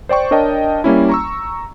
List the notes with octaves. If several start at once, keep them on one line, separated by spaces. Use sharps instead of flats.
C5 D5 G5 C#6
D4 A#4 C#5 D#5 G5 A5
G3 A#3 C#4 E4
A#5 C#6 E6